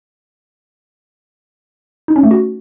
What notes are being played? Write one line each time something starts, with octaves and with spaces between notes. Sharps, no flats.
D#4
C#4
A3
F#4